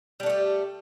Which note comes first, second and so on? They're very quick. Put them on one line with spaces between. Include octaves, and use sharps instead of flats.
G3 D4 A3 G4